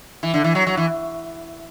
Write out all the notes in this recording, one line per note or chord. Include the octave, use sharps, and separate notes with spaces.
E3
D3
E3
F#3
F#3
E3